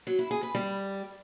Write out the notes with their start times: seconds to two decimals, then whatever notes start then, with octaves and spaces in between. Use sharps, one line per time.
0.07 F#3
0.19 E4
0.31 G#4
0.43 B4
0.55 G3